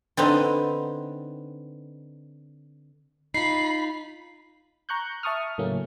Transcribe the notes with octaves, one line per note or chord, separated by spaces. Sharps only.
D3 B3 C4 D#4
D#4 F4 B5 C7
A#5 C#6 F#6 G6
E5 A5 C#6 D#6 F6
A2 C#3 F#3 A3 A#3 C#4